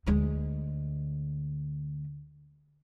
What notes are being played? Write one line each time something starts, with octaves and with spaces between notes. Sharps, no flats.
D2 G#3